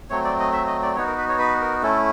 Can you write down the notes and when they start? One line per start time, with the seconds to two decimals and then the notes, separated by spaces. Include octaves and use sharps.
0.10 F#3 A3 C4 C#5
0.24 D5
0.39 D#5
0.52 E5
0.67 D#5
0.82 D5
0.96 B3 D#4 F#4 C#5
1.07 A#4
1.18 B4
1.29 C#5
1.39 B4
1.60 A#4
1.82 A3 C#4 E4 A4